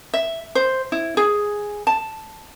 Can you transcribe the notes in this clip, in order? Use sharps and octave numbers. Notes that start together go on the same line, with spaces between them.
E5
C5
E4
G#4
A5